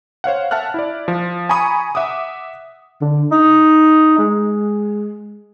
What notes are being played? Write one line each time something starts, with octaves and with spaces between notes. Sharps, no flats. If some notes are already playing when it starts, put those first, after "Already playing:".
C5 C#5 F5 F#5
E5 F#5 A5 F6 F#6
E4 D5
F3
G#5 A#5 B5 C#6 D#6
E5 F#5 D6 D#6
D3
D#4
G#3